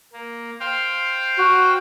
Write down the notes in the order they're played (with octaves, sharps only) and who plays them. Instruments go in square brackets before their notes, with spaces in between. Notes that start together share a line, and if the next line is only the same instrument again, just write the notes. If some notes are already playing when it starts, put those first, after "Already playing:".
[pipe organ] A#3
C5 F5 G5
[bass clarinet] F#4